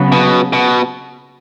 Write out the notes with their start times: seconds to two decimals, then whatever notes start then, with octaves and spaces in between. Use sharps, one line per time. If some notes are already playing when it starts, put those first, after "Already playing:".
Already playing: C#3 F#3 B3
0.12 B2
0.53 B2